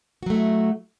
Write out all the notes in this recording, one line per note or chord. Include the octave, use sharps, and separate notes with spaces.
F#3 A3 E4 F#4